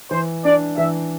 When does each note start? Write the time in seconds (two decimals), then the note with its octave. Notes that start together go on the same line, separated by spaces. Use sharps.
0.11 E3 C5
0.45 D4 D5
0.77 E3 E5